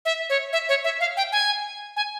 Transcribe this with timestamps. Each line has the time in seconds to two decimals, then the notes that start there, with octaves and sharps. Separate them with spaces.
0.05 E5
0.29 C#5
0.53 E5
0.69 C#5
0.84 E5
1.00 F5
1.17 G5
1.32 G#5
1.96 G#5